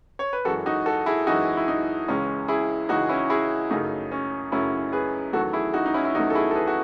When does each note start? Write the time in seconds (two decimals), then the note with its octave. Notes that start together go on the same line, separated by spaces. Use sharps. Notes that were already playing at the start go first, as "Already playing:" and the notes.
0.19 C#5
0.33 B4
0.45 F#2 E3 G#3 F#4 A4
0.66 D#4 F#4
0.86 F#4 A4
1.06 E4 G#4
1.27 F#2 E3 G#3 D#4 F#4
1.57 E4
1.68 D#4
2.08 C#2 C#3 E3 G#3 C#4
2.48 E4 G#4
2.89 C#2 C#3 E3 G#3 D#4 F#4
3.09 C#4 E4
3.30 E4 G#4
3.71 F#2 C#3 F#3 A3 D#4
4.11 C#4
4.52 F#2 C#3 F#3 A3 C#4 E4
4.93 G#4 B4
5.33 E2 D#3 F#3 A3 F#4 A4
5.53 E4 G#4
5.74 D#4 F#4
5.86 D#4
5.94 C#4 E4
6.05 E4
6.15 E2 D#3 F#3 A3 D#4 F#4
6.30 A4
6.35 E4 G#4
6.51 A4
6.55 G#4 B4
6.67 F#4